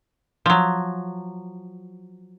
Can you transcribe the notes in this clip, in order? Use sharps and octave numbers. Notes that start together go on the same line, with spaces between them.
F3 F#3